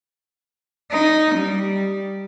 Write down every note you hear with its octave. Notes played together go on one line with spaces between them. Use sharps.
D#4
G3